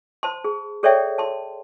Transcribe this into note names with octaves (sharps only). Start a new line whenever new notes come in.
C5 A5 C6
G#4
G#4 A4 C#5 D5 E5 G5
A5 C6